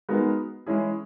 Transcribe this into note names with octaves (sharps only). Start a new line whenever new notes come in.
G#3 B3 D#4 F#4 A#4
E3 G#3 C#4 E4 G#4